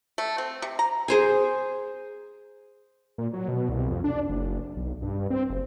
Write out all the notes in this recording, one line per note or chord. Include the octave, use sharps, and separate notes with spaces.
A3
C4
C3
A#5
G#4 C5 G#5
A#2
F#3
B2
C2
F2
D4
F#1
B1
G2
C4
F#1